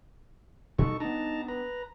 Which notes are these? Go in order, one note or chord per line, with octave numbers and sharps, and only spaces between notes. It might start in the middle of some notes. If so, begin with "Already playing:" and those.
B2 G3 D#4 A4 C#6
B3 D4 D#4 A5 A#5
B4 A#5